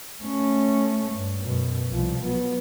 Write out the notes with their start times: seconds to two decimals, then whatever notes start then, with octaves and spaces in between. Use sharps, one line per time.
0.22 A3 C#4
1.11 G2
1.43 F#2 B2
1.89 C2 F3
2.25 F#3 B3